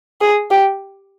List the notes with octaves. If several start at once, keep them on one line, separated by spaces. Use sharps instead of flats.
G#4
G4